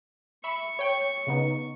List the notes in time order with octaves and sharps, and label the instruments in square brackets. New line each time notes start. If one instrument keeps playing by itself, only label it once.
[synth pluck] E5 B5 E6 [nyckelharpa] C#6
[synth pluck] C#5 G5
C#3 B3 D#4